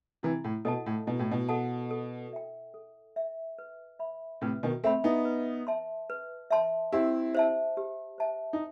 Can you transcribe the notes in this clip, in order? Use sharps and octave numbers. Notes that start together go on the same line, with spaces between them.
C3 E3 E4
A2
B2 A4 D#5 F#5 A5
A2
B2 E4
A2
B2
A4 D#5 F#5 A5
A4
E5 G5
A4
E5 G5
B4
E5 B5
A2 C3 B4
B2 D#3
A3 C4 E5 B5
B3 D#4
B4
E5 A5 C6
B4
E5 A5 C6
C4 E4 G4
C5 E5 A5
G4
C5 E5 A5
D#4